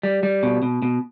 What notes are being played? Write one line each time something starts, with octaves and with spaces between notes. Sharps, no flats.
G3
G3
B2
B2
B2